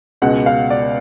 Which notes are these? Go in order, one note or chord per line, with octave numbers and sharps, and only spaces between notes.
C#2 B2 G#3 F#5
F5
D5